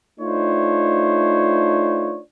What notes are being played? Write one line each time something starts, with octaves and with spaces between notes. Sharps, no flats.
A3 D4 D#4 F4 C5 C#5